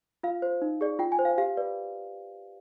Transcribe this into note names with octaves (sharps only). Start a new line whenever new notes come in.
F4 F5
C5
D#4
G#4 D5
F4 G5
G#5
C5
F5
G4 F5
B4 D5